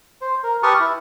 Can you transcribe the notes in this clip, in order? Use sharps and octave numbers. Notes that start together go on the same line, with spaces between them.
C5
A#4
G4 B4 A5 C#6 D#6 F6
E4